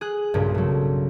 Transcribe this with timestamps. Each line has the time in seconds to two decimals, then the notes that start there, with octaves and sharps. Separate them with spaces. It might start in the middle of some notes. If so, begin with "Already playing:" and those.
0.01 G#4 F#6
0.34 B1 G2 A#2 C#3
0.54 F#3 A3